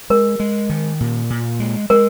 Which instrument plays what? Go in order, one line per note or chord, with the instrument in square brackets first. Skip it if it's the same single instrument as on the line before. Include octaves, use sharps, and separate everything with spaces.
[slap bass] G#3 [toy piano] A#4
[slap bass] G#3
D#3
A#2
A#2
G#3
[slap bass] G#3 [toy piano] A#4